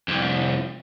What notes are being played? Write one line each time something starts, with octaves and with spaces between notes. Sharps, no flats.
C2 F2